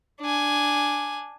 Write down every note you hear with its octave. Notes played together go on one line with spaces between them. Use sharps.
D4 G#5